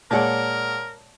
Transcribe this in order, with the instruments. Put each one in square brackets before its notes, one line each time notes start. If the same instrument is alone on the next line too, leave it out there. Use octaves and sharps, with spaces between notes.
[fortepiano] A#2 G#3 F#5 [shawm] A#4 [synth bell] C#5 D5 A5